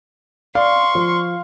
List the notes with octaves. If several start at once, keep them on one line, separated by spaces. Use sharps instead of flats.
D5 F5 C6 C#6
F3